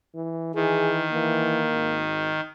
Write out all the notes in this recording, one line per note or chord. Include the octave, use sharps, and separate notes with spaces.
E3
D#3 E3 G#4
E3 A#3
G#1